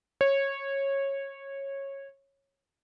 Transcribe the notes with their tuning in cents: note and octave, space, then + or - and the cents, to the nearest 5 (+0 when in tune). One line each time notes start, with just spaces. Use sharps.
C#5 -15